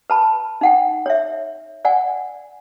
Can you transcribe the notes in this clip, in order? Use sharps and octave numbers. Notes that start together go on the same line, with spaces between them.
B4 A5 B5
D#4 F#5 G5
C#5 E5
D5 F#5 G#5